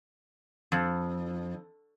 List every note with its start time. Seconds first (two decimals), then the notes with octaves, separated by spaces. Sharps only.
0.72 F2